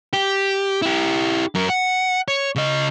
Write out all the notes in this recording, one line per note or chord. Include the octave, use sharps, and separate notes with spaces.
G4
E4 G4
F#2 A#4
F#5
C#5
C#3 D#5